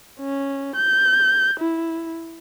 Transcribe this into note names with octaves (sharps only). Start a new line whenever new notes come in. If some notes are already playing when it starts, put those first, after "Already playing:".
C#4
G6
E4